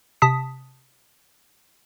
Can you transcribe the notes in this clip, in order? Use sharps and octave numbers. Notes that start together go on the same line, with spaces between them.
C3 A5 D#6 B6